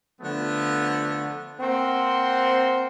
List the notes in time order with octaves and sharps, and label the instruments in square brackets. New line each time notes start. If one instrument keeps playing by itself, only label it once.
[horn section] D3 F3 A3 B3
A#3 C4 F#5 C6